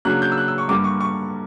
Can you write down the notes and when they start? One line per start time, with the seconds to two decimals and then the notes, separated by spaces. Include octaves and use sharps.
0.05 C#3 F#3 A#3 D4 F#6
0.22 G6
0.32 E6
0.37 F#6
0.48 E6
0.58 C#6
0.68 G2 D3 A#3 D6
0.84 C#6
1.00 C#6